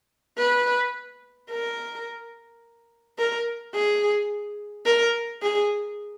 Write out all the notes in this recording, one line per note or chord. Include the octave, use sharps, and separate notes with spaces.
B4
A#4
A#4
G#4
A#4
G#4